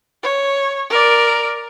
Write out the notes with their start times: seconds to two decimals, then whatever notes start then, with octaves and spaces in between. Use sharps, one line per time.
0.23 C#5
0.90 A#4 D5